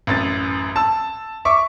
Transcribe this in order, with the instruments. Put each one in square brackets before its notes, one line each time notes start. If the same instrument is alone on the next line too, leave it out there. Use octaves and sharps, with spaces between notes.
[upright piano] A1 F#2 A6
A5 E6
E5 C#6 D6